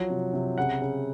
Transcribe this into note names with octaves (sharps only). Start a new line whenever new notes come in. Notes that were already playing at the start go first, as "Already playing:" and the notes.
Already playing: F3 F#3
C3
C3
C#3 F#5
C#3